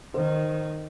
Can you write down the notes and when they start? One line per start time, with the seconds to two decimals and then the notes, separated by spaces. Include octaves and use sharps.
0.14 D#3 C5